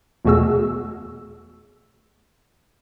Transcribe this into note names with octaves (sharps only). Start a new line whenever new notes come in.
E2 B2 A3 F#4 G#4 E6